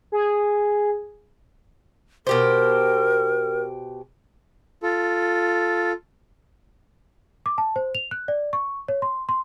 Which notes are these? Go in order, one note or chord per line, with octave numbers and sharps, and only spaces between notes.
G#4
B2 G4 A#4 C5
F4 A4
D6
A5
C5
F7
F#6
D5
C#6
C#5
C6
C6